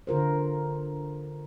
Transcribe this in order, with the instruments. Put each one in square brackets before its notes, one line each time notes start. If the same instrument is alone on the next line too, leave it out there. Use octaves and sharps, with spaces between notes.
[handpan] D3 F4 A#4 C5